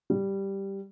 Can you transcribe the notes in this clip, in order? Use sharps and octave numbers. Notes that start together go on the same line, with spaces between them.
G3